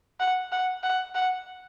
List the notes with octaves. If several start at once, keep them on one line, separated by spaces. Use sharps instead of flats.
F#5
F#5
F#5
F#5